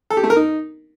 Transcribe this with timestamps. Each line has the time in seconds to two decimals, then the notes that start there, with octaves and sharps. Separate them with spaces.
0.10 A4
0.17 G4
0.23 A3
0.30 A#4
0.36 D#4